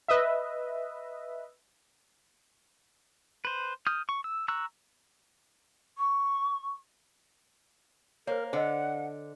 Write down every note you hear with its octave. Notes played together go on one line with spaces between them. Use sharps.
B4 D#5 E5
B4 C5
D#6 F6 G6
C#6
E6
A#5 C#6 E6 F#6
C#6
A#3 A#4 C5 C#5
D3 C5 D#5 F#5